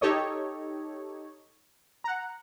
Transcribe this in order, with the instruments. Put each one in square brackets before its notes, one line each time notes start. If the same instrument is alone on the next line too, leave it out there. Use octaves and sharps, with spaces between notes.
[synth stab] D#4 G4 A4 C#5 D#5
F#5 A#5